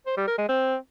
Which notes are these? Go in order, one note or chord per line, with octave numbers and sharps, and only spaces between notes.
C5
G3
A#4
G#3
C4